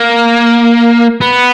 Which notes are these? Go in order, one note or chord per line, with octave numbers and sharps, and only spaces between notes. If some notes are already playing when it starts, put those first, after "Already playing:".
Already playing: A#3
B3